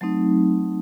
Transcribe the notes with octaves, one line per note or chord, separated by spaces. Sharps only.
F#3 A3 C4 D#4